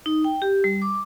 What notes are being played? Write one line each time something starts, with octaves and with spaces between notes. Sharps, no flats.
D#4
G5
G4
G3
D6